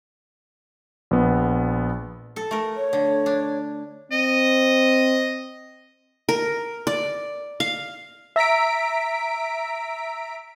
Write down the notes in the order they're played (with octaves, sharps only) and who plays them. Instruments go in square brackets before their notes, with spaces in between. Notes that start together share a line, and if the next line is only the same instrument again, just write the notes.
[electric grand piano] A#1 B3
[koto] A4
A3 A#4
[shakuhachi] C#5
[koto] D3
D4
[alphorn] C4 [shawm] D#5
[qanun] A#4
D5
F5
[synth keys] E5 A#5 B6 D7